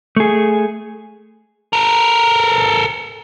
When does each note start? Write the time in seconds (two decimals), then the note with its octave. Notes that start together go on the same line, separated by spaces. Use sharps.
0.16 A3 G#4
1.73 A4 A#4